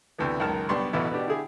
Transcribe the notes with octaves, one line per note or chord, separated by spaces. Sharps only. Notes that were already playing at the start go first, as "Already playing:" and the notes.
D2 C3 E3 B3
C#2 F#2 D#3 A#4 A5 F6
B1 G3 B3 D4 C6 C#6
A1 B2 E3 B3 E4 A4
B2 B3 D4 G4
D3 E4 G4 G#4